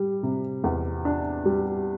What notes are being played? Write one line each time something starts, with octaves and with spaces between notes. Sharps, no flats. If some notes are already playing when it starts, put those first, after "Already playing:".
Already playing: G3
C3
E2
D4
G3